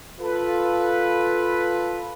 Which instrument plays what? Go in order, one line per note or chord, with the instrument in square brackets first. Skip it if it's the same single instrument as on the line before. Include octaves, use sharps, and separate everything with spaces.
[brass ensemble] F4 A4 B4